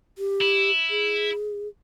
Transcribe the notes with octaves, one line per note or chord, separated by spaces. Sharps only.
G4
E4
G#4